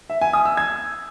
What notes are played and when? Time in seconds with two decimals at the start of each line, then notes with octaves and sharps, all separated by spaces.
0.10 E5
0.21 G#5
0.33 D#6
0.45 E6
0.57 G#6